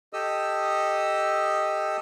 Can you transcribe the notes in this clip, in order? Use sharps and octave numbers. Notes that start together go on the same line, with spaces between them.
G4 A4 D#5 D#6 E6